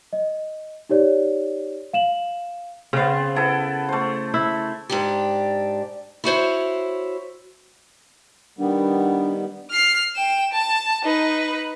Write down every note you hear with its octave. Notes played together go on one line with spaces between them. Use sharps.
D#5
D#4 G4 C#5 D5
F5 E7 F#7
C#3 B3 C4 F5
B3 E4 A4
A3 C5
E4
G#2 D4 G4
E4 F#4 C5 C#5
D#3 G3 B3 D4
F6 C7
G5 E7
A5
D#4 B4